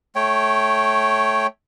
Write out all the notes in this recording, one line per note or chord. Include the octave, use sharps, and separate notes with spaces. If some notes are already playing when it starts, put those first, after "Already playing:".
A3 C#5 G5